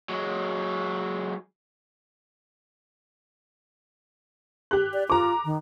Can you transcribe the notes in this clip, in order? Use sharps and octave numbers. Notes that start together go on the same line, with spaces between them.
F#3 G#3
G4 F#6
D5
F4 A#5 D6
D#3